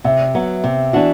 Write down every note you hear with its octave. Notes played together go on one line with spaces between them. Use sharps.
C3 E5
F#3 B3
C3
E3 B3 D4 F#4